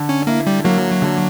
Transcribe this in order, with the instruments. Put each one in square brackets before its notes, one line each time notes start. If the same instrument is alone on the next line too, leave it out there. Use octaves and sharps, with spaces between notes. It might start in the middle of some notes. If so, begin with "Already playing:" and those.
Already playing: [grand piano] D3
[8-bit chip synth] C#4
[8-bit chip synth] A#3 [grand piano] E4
[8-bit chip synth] G3
[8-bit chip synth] F#3 [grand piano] A#3
[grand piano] D3